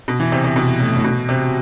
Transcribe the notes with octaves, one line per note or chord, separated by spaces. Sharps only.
B2
E3
C3
C3
B2
A2
A2
B2
C3